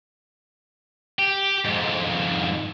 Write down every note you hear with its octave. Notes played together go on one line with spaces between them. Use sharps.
G4
F2 G#2